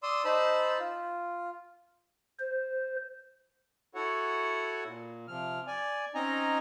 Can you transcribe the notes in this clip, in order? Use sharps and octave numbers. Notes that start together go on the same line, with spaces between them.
D5 C6 D#6 E6
D#4 C5 A5 B5 E6
F4
C5
E4 F#4 A4 C#5 F#5
A#2
C3 F3 F6
D5 G#5
C4 C#4 D#4 D#5 G#5 A#5